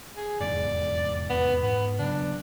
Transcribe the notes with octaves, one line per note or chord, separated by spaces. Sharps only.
G#4
F1 E2 G#2 D5
B3
G#2 B3
C#3 F#3 B3 D4